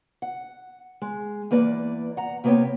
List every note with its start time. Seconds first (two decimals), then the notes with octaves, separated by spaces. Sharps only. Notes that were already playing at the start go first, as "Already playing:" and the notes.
0.22 F#5
1.02 G#3
1.51 E2 A#3 B4 D5
2.17 F#5 A#5
2.44 C3 A#3 B3 B4 C#5 G5